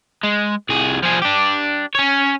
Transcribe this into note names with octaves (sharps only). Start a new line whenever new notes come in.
G#3
C2 G#4
F3 G#4
D4 G4
C#4 C#5